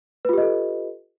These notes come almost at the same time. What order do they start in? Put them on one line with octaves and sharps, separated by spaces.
B4 F4 G4 D#5 A4